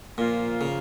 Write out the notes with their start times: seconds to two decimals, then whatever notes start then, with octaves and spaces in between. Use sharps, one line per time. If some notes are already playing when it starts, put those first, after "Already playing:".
0.18 A#2 F3 A#3 F4
0.61 C#3